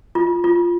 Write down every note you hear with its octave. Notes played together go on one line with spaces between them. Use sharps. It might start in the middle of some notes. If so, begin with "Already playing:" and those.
F4
F4